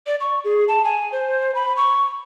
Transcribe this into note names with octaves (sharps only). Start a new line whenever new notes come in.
D5
C#6
G#4
A5
G#5
C5
B5
C#6